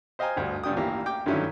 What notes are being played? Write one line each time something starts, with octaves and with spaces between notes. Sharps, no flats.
C5 D#5 F5 G5 G#5 A#5
D2 G2
C#2 G2 D4 G5 D#6
A1 E3 A#3 G4
G5 D6
G2 D3 D#3 F#3 C#4 E4